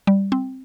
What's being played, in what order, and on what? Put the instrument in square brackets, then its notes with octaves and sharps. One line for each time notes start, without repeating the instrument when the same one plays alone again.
[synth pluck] G3
C4